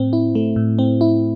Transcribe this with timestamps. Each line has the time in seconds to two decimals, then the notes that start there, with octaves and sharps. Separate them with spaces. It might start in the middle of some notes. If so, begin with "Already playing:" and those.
Already playing: A2 C4
0.13 E4
0.35 A3
0.56 A2
0.79 C4
1.01 E4